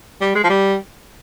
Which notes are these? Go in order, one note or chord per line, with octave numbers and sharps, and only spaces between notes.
G3
G#3
F3
G3